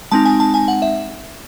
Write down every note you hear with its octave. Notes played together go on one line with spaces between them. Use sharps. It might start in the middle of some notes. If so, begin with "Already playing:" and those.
G#3 C4 D#4 A5
G#5
A5
G#5
F#5
E5